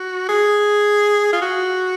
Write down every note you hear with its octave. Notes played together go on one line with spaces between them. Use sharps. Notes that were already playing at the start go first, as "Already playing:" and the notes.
Already playing: F#4
G#4
F4
F#4